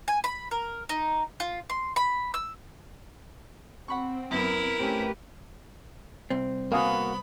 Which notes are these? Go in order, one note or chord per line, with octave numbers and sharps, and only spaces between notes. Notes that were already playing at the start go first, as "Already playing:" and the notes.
G#5
B5
A#4
D#4
F4
C6
B5
E6
C4 F#5 B5 C#6
F#2 B3 E4 A#4
A3 C4 C#4 G4 B4
C2 C4
A#3 B3 F#4 F5 G#5 B5 D#6